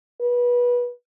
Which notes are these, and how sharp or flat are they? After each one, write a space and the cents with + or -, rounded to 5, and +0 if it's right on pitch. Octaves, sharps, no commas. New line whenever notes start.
B4 -25